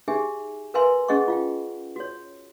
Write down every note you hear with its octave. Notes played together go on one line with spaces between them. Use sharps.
D#4 G4 G#4 E5 G#5
A#4 B4 E5 F5 G#5 C6
C#4 G#4 D#5 F#5 C#6
F4 F5 G5
F#4 C#5